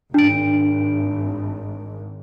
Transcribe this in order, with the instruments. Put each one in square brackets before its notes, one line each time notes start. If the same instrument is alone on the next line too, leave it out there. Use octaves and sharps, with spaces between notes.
[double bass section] G#1 [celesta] D4 D7